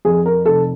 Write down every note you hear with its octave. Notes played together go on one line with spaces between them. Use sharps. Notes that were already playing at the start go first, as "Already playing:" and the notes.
F2 G#4
A#4
F1 A4